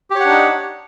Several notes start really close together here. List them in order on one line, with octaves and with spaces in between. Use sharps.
G4 C#5 F#5 D4 D#4